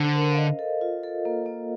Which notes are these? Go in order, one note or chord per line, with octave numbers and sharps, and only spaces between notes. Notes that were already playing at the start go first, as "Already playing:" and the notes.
Already playing: D3 C5
A#4
F5
D#5
A4
F4
A4
A#3
A#3